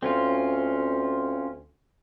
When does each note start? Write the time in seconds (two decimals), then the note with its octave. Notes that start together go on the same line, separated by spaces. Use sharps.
0.03 D2 C4 C#4 F4